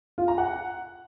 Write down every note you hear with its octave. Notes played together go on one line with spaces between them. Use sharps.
F4
A#5
F#5